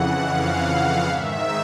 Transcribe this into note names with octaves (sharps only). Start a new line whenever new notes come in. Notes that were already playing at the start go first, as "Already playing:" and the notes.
Already playing: F2 C#3 E3 F#5
F5
G#2 D#3 E5